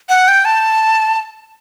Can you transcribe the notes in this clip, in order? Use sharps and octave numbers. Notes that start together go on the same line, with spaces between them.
F#5
G5
A5